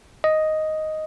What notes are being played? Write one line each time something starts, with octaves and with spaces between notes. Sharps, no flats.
D#5